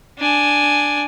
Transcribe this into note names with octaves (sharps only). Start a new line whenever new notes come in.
D4 G#5